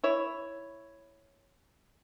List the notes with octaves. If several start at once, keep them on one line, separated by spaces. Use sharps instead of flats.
E4 C#5